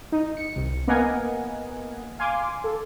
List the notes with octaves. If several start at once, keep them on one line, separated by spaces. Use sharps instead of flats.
D#4
C#7
C2
A#3 B3 A#4 D#5 F#5 G#5
F5 G#5 C6 D6
A4